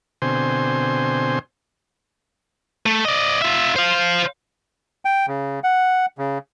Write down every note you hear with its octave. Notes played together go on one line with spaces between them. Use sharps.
B2 D3 C4 C5 G#5 C6
A3
D5 D#5
F4 E5
C5 F5
G5
C#3
F#5
C#3